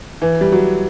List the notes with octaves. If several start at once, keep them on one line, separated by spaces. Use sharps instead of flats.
E3
G3
F#3